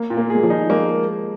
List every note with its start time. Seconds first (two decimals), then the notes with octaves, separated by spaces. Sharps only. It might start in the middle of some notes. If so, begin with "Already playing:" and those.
Already playing: A#3
0.10 A#2
0.17 A#3
0.30 G#3 G#4
0.43 F3
0.50 D#4
0.70 G#3 A#3